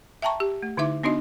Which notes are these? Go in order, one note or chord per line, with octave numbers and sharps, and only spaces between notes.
E5 G5 A5 A#5 C#6
G4
A3
D3 D#4 E4 E5 D6
B3 D4 D#4 F#4 D#5